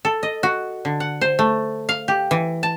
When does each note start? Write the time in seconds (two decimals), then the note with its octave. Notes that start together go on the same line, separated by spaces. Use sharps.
0.05 A4
0.23 D#5
0.43 F#4
0.85 D3
1.00 F#5
1.21 C5
1.39 A3
1.89 F5
2.08 G4
2.31 E3
2.63 A5